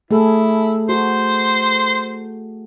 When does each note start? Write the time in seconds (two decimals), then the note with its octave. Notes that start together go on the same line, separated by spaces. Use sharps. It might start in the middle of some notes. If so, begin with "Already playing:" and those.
0.11 A3 E4 G#4 A4
0.89 F#4 C5